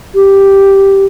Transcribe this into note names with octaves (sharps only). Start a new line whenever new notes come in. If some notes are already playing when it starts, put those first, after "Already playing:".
G4